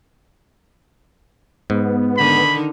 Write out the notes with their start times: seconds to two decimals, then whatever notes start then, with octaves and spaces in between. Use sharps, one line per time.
1.70 G#2 B3
2.17 D3 D#3 D#4 B5